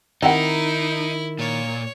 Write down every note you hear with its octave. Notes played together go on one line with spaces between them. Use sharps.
D#3 C4 D#4 E4 G4 F#5
A#2 C#5